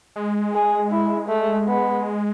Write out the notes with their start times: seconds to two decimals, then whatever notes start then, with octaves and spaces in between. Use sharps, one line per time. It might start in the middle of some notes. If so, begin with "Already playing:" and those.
0.16 G#3
0.53 G#4
0.91 E4
1.28 A3
1.67 B3